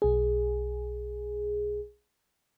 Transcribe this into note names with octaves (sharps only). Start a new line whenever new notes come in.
B1 G#4